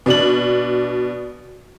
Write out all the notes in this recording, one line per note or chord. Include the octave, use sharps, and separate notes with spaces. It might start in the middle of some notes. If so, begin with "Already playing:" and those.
B2 D4 F#7